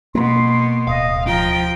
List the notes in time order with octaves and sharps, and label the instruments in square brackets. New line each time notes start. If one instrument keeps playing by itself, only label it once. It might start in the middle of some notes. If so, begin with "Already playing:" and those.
[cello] B2 [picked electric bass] A#3 [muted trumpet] C6
[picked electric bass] D1 [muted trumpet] D#5 [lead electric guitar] F5
[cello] F3 G5 [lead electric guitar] F4 [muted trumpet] A#5